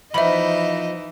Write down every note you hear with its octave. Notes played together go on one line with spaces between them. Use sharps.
E3 F3 B3 D#4 D#5 E5 B5